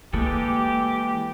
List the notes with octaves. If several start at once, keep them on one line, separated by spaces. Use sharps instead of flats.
E3 G#3 A#3 G4 A4